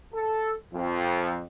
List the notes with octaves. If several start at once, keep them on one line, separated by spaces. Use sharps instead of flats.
A4
F2